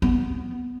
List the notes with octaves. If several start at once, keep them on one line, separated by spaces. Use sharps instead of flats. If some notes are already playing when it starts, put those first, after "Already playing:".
B3